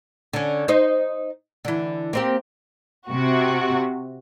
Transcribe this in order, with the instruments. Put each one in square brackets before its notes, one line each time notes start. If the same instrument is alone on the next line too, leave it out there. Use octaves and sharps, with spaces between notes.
[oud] D3 C#4
D#4 C5 D#5
D3 E3
A#3 C4 G4
[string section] C3 F#4